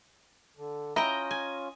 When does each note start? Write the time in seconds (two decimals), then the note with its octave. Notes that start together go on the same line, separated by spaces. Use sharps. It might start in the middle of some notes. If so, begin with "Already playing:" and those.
0.57 D3
0.96 C#4 E4 F4 D#5 G5 A#5
1.31 G#5